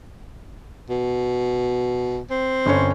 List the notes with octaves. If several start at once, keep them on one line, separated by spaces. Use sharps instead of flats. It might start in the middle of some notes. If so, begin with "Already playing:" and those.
B2
C4
G1 C#4 C#5